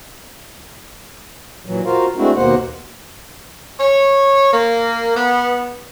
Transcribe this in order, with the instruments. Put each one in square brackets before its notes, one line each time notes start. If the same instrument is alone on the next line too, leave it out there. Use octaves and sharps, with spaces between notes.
[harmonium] A#2 E3 F#3
F4 F#4 A#4 C5 F5
G#3 A3 C4 D4 E4 F#4
D#2 B2 A#3 C5 F#5
[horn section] C#5
A#3
B3